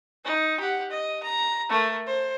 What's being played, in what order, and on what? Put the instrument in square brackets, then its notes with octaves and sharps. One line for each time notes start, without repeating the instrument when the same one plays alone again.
[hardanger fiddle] D#4
G4 F#5
D#5
A#5
A3 A#4
C5